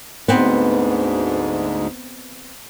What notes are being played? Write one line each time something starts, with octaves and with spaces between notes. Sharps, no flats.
D2 G#2 B3 C4